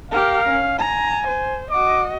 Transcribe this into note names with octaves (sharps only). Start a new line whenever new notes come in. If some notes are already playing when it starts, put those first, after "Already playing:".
G4 A#4 F5
C#4
G#5 A#5
C5
F#4 D#5 D6